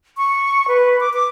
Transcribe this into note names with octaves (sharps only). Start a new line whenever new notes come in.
C#6
B4
D6
D6